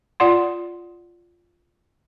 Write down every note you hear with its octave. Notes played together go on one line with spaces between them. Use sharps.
F4 D5 F#5 C6